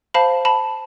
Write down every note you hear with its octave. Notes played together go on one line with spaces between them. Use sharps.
C5 F5 A5 B5
A5 B5